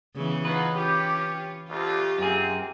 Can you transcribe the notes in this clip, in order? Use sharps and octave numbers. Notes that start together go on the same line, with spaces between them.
C#3 E3 B3
F#3 B3 D#4 F4 B4
C#4 F4 G4
D2 F4 G4
F#2 A#3 C4 G#4